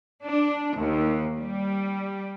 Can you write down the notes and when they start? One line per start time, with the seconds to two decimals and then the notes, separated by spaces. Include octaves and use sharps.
0.24 D4
0.76 D#2
1.36 G3